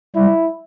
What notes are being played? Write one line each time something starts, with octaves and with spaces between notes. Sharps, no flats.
G3 E4